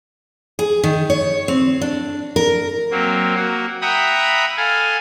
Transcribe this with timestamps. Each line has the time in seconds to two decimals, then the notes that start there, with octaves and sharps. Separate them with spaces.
0.59 G#4
0.84 D#3
1.10 C#5
1.48 C4
1.81 D4
2.36 A#4
2.91 F#3 A#3 C4
3.35 A#3 F#4
3.82 E5 F#5 G5 A#5 B5 D#6
4.57 A4 F5 G#5